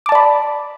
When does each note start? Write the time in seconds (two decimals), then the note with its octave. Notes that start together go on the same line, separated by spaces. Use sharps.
0.06 D6
0.09 A5
0.12 D5
0.15 B5